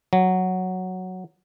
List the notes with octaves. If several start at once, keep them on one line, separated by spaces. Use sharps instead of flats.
F#3